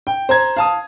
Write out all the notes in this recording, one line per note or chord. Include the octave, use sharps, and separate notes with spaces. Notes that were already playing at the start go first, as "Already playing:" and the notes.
G5
C5 A#5 G#6
F5 A5 D#6